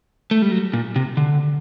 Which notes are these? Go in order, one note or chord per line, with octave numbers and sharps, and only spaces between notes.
A3
G3
F#3
A#2
C3
D3